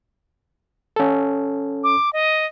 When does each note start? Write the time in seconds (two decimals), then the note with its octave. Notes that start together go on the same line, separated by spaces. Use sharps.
0.96 C#4 A4
1.84 D6
2.13 D#5